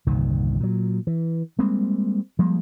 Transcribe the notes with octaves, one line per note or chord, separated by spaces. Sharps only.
G1 C2 A#2 D#3
A#2 F#3
E3
G3 G#3 A#3 C4
F3 G3 G#3 A#3